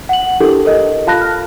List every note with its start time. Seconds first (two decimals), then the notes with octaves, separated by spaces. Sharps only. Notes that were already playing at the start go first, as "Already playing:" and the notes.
0.09 F#5 F#7
0.40 D4 E4 G4 A4 A#4
0.65 A4 A#4 D#5
1.07 F4 F5 A5 B5 F#6 A#6
1.21 F6